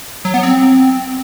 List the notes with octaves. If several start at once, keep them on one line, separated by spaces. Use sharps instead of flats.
F#3
B3
C4